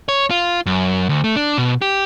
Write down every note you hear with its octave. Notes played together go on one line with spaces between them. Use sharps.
C#5
F4
F#2
D2
A3
D4
B2
G4